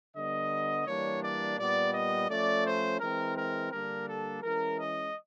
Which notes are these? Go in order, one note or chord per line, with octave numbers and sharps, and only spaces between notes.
D3 G3 B3 D#5
E3 G3 A#3 D4 C#5
D5
A#2 G3 B3 D5
D#5
F3 A3 C#4 D5
C5
E3 G#3 C4 A#4
A#4
D3 G3 A#3 D4 A#4
A4
E3 G#3 C#4 A#4
D#5